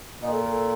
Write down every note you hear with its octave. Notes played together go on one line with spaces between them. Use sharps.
A#2 D#5
A4
A#4
A4